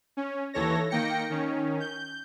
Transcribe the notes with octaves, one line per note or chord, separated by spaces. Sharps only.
C#4
D#2 E3 A4 C#5 A#6
D#3 A#3 G5 A#6 C#7
D#3 C#4
G6